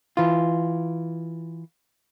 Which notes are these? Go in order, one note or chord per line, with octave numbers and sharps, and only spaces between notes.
E3 F4